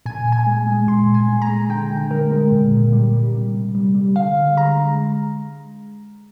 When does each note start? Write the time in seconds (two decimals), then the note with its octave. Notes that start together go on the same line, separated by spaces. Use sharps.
0.06 A#2 G#5
0.26 A#2
0.32 G#5
0.46 G#3
0.67 G#3
0.88 A#2 C6
1.08 A#2
1.14 G#5
1.28 G#3
1.42 A#5
1.49 G#3
1.69 D3 G5
1.91 D3
2.10 G#3 A#4
2.31 G#3
2.52 A#2
2.72 A#2
2.93 G3
3.13 G3
3.34 C3
3.54 C3
3.75 G3
3.95 G3
4.16 D3 F5
4.36 D3
4.57 G#3 A#5
4.77 G#3